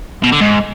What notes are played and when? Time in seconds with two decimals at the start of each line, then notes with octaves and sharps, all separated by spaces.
0.23 B2
0.32 D3
0.40 G#2